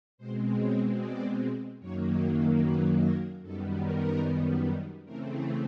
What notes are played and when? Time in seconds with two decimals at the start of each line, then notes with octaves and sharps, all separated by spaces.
0.18 B2 G#3 C4 C5
0.58 C#5
0.98 D5
1.79 F#2 D#3 F#3 A#3 C#5
2.61 B4
3.02 A#4
3.42 F#2 D#3 G3 B3 A4
3.83 A#4
5.04 C#3 E3 A3 C4 A#4